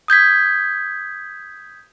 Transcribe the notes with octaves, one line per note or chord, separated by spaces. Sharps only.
D#6 G6 G#6 B6